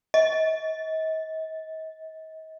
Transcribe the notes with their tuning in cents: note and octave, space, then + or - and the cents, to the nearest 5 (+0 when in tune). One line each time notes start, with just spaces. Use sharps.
D#5 +40